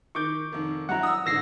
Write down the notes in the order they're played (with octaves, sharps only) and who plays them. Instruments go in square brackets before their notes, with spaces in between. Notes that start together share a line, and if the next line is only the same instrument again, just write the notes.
[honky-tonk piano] D#3 G6 [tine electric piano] C#6 D6
[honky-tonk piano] F1 D#3
[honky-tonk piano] G2 F#3 E4 [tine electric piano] F#5 A#5
[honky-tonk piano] D#6 E6
[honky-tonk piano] A1 G#2 D3 [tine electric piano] E6 A#6 C7